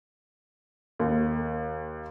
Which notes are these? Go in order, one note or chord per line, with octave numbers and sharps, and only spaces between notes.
D#2